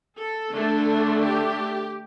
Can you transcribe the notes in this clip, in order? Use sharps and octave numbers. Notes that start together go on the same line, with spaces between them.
A4
D3 A3 D4
G4